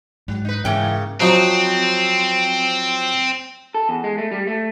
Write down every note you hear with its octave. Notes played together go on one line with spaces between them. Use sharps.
G#2 F#3
D#4 B4
G#2 C#3 E3 A#3 G5
F3 F#3 C4 D#4
A4
E2
G#3
A3
G3
A3